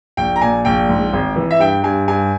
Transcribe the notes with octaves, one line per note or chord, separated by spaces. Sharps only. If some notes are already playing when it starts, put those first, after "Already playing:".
A#1 G5
A#5
A#2 G#5
A#1 G5
G#2
G#1
E3
E5
G2 G5
G2 G#5
G2 G#5